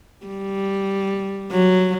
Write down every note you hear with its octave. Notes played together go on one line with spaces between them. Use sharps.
G3
F#3